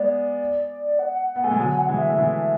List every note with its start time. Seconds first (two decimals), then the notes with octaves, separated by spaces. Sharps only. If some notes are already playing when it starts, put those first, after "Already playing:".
Already playing: G#3 B3 D5
0.99 F#5
1.14 F#5
1.29 F#5
1.36 B3
1.44 A3 G#5
1.51 G#3
1.59 D3 F#3 G#5
1.79 F#5
1.88 E3 G#3
1.98 E5
2.10 A3
2.18 E3 G#3